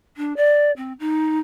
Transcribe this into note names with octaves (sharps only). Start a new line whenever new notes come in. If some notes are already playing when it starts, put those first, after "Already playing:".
D4
D5
C4
D#4